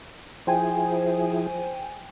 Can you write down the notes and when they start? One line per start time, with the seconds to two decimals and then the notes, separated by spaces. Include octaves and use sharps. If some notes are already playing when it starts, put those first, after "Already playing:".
0.47 F3 E4 G#4 C5 G5 G#5